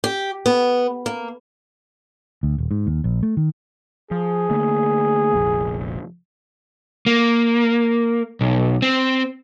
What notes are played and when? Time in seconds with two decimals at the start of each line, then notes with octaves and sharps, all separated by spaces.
0.04 G4
0.46 B3
1.06 A#3
2.43 D2
2.58 D#1
2.71 G#2
2.87 D#2
3.04 A#1
3.23 A3
3.37 D#3
4.11 F3 G#4
4.50 D3 A3 A#3
5.34 F1 A#1
7.06 A#3
8.41 B1
8.82 C4